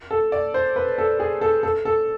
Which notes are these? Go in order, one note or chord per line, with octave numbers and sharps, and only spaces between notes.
A4
D5
C5
B4
A4
G#4
A4
A4
A4